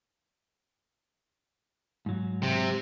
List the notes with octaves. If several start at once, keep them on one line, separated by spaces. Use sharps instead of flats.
G#2 F#3
C3